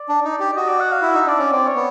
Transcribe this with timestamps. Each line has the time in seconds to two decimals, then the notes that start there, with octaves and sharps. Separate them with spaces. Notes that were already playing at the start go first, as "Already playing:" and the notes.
Already playing: D5
0.09 D4
0.25 D#4
0.40 G4
0.51 D5
0.56 F#4 D#5
0.68 D5
0.80 F#5
0.92 F5
1.02 E4 E5
1.14 D#4
1.26 D4 D5
1.39 C#4
1.51 C4 D5
1.67 C#5
1.75 B3